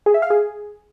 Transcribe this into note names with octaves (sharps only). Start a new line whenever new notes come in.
G#4
E5
F5
G#4